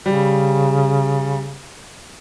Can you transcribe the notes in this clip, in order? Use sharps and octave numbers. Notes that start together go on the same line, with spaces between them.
C#3 G3